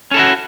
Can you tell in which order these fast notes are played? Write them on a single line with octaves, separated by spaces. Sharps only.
C#4 A4 E4 F#4